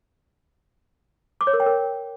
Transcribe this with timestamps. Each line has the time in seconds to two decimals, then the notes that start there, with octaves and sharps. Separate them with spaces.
1.41 D6
1.47 C#5
1.53 A#4
1.60 G5
1.66 A#4